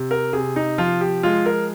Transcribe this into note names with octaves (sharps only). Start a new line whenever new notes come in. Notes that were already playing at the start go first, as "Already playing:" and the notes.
Already playing: C3
A#4
C3 G#4
D#4
F3 F4
G4
G#3 F4
A#4